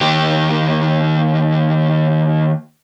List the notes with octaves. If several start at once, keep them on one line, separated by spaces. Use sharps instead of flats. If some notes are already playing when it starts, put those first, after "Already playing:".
D#2 G4